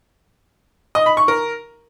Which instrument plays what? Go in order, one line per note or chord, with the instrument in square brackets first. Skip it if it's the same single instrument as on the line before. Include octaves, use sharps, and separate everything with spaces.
[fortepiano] D#5
B5
C#6
A#4